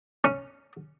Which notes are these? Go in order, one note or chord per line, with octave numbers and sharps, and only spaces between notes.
C#4